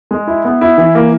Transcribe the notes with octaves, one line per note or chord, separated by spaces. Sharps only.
G#3
E4
B3
E4
E3
A#3